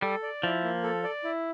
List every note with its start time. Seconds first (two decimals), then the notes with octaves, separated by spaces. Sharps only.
0.02 G3 A4
0.23 D5
0.43 F3 E4
0.63 A#3
0.84 A4
1.04 D5
1.24 E4